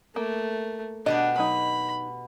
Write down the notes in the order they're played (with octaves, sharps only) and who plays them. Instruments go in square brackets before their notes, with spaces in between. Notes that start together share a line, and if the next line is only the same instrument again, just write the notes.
[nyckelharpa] A3 [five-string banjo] A#3
[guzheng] B2 G4 B4 [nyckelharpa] D4 [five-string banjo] D#5
[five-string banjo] F#3 D#4 [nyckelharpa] B5